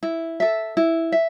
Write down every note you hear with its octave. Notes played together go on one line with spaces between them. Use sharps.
E4
A4 E5
E4
E5